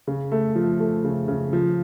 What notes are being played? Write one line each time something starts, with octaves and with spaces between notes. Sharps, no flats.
C#3
A3
F3
A3
C#3
C#3
F3